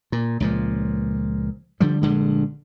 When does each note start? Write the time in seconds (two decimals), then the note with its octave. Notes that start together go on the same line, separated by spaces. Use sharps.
0.12 A#2
0.40 C#2 A#2 F3
1.80 D3 F3 G3
2.02 A#1 G2 D3 G#3